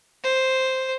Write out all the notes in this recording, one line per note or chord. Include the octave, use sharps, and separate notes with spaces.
C5